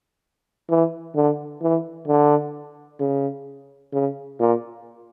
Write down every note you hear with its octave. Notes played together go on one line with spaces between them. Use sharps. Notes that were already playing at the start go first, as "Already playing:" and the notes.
E3
D3
E3
D3
C#3
C#3
A#2